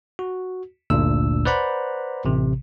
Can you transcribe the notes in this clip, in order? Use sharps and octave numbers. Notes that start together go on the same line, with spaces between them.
F#4
G1 D2 A#2 D4 E6
B4 C5 D5 F#5 A#5 B5
A1 C3